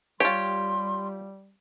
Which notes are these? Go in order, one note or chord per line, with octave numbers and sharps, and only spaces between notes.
G3 F4 G4 C#5 C6